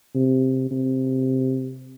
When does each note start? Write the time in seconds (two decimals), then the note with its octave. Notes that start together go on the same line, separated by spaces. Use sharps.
0.15 C3
0.71 C3